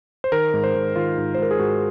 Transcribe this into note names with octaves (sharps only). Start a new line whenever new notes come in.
C5
D#3 A#4
G#2
C5
G#2
D#3 F4
G#2
C5
G#2 A#4
G#4
G#2 F#4